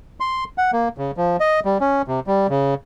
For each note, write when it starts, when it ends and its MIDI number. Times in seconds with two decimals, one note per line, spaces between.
0.20 0.44 84
0.58 0.71 78
0.73 0.88 58
0.98 1.11 49
1.17 1.37 53
1.40 1.60 75
1.65 1.78 55
1.81 2.02 61
2.08 2.20 48
2.27 2.47 55
2.50 2.74 49